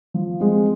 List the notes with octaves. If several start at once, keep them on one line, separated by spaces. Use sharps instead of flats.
F3
G#3 C4